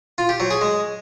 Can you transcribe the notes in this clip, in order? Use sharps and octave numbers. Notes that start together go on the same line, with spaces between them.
F4
G4
F#3
G#4
G#3